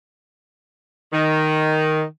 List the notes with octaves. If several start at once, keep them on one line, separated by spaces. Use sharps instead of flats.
D#3